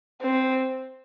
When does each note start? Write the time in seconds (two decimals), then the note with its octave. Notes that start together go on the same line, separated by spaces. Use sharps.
0.22 C4